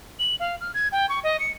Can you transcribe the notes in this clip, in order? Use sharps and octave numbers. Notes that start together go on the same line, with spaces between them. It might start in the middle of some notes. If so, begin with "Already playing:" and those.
F#7
F5
F6
G#6
G5
C#6
D#5
C#7